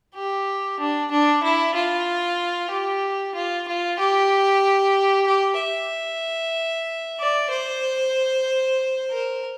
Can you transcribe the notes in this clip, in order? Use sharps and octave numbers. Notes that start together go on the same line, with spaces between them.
G4
D4
D4
E4
F4
G4
F4
F4
G4
G4
E5
D5
C5
A#4